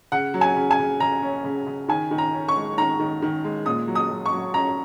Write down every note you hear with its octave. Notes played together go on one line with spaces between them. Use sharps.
C#3 F#5
F#3
G#5
C#3
G#5
C#3
C#3 A#5
C#4
C#3
C#3
D#3 G#5
D#3
A#5
C#4
C#6
G#3
D#3 A#5
D#3
D#3
G#3
A#2 D#6
F#3
D#6
F#3
C#6
F#3
C#4 A#5